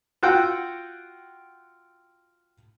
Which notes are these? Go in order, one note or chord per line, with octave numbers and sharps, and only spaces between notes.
F4 F#4 F#5 G5 E6